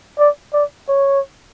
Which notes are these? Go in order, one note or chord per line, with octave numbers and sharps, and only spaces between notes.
D5
D5
C#5